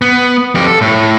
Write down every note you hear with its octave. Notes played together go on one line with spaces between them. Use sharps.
B3
F2 G4
A4
A2